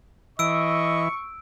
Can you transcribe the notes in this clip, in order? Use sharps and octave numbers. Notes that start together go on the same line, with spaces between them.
E3 D#5 C#6 E6 D7